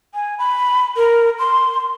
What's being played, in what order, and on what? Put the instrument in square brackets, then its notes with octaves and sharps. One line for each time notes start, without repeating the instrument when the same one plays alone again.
[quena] G#5
B5
A#4
C6